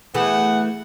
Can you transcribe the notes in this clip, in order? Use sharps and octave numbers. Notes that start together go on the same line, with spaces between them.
E3 A3 B3 G#4 F#5